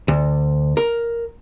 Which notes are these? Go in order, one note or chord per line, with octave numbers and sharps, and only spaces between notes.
D2
A#4